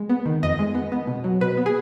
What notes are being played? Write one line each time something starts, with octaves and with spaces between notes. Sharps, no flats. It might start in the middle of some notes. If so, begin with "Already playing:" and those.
Already playing: G#3
B3
D#3
F2 D#5
G#3
B3
B3
B2
F#3
B2 B4
B3
G#4